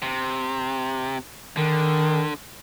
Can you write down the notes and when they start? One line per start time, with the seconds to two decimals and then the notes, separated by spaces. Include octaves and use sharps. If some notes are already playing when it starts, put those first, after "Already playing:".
0.02 C3
1.57 D3 D#3